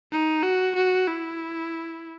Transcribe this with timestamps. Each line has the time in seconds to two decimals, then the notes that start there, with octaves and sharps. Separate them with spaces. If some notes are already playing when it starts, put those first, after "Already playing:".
0.12 D#4
0.43 F#4
0.76 F#4
1.08 E4